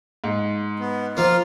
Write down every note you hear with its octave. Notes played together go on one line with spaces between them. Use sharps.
G#2
B3
F3 A#3 F4 F5